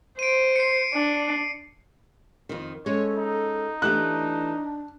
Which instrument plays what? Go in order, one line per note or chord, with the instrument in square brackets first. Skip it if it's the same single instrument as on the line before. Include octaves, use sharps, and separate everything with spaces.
[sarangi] C5 [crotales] D7 D#7
[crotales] C7 C#7
[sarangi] D4
[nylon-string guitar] F2 D#3
[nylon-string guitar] G#3 C#4 [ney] A4 [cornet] C#5
[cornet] D#4
[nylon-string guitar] E3 A3 G4 [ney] D4 [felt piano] F#6